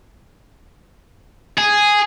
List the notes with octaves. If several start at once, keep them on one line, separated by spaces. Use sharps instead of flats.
G#4